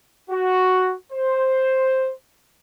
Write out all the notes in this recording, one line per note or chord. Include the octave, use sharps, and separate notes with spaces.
F#4
C5